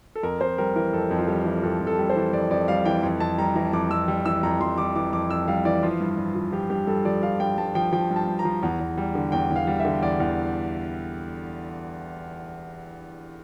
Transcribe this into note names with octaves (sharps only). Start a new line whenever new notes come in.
A4
F2 A#4
F2 C5
G3 A#4
E3 A#4
F2 A4
F2
F4
G3 G4
E3
F2 A4
F2
A4
G3
C5
E3
F2 D5
F2 D5
G3 F5
E3 G5
F2
F2 A5
G3 A#5
E3 A#5
F2 D6
F2 E6
G3
E3 E6
F2 A#5
F2 C6
G3 D6
E3 D6
F2 D6
F2 E6
G3 F5
E3 D5
F3 F4
G2
G2
F3
F3 G4
G2 G4
G2 A4
F3 D5
F3 F5
G2 G5
G2 A5
F3 G5
F3 G5
G2
A5
G2
A#5
F3
E2
E2
G3
D3
E2 G5
E2
F5
G3
E5
D3
E2 D5
E2